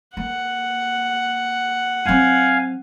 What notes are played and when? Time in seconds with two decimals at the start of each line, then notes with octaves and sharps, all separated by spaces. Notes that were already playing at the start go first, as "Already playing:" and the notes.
0.17 A#3 F#5
2.05 F#3 C4 F5 G#5